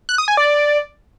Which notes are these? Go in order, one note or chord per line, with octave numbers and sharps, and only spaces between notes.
F#6
D#6
G#5
D5